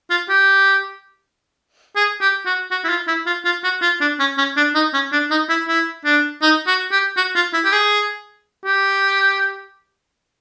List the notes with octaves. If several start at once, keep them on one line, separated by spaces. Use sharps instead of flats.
F4
G4
G#4
G4
F#4
F#4
E4
F4
E4
F4
F4
F#4
F4
D4
C#4
C#4
D4
D#4
C#4
D4
D#4
E4
E4
D4
D#4
F#4
G4
F#4
F4
E4
G4
G#4
G4